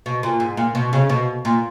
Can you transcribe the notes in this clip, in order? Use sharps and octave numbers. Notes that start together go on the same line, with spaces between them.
B2
A#2
G#2
A#2
B2
C#3
B2
A#2